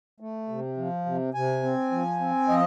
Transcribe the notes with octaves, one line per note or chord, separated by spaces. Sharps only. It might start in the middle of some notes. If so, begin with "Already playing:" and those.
A3
C3
F3
C3
C3 G#5
C4
F3
C4
F3 D#5